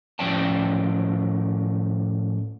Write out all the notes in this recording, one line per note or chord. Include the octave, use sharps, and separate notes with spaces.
A2 F3 C#4 D5 G5 A5